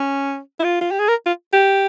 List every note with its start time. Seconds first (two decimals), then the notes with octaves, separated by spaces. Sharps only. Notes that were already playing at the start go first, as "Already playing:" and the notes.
Already playing: C#4
0.59 E4
0.64 F4
0.81 F4
0.91 G4
0.99 G#4
1.08 A#4
1.26 F4
1.53 G4